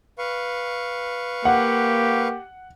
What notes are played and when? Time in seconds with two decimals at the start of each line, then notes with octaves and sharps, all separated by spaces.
0.19 B4 F5 C#6
1.45 A#3 G4 F#5